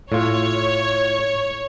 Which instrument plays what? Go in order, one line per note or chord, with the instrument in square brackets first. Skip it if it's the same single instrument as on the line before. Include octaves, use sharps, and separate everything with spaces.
[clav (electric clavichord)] A2 F4 [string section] C#5